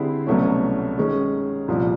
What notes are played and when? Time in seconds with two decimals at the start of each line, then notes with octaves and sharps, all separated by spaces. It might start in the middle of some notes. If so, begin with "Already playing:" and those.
Already playing: D3 G3 C4 E4 G#4
0.27 C2 B2 F#3 A3 C#4
0.97 D#3 G#3 C#4
1.68 C2 A#2 F3